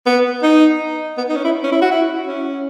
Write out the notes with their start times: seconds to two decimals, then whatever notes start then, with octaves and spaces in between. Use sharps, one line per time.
0.06 B3
0.43 D#4
1.18 B3
1.29 D#4
1.36 C#4
1.45 E4
1.63 C#4
1.72 E4
1.82 F#4
1.91 E4
2.27 C#4